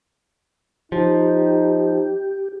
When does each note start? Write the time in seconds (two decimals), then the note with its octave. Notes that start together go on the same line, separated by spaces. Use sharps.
0.92 F3 D#4 G4